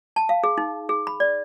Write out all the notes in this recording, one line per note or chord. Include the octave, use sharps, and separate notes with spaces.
A5
F5
G#4
D#4
G#4
B5
D5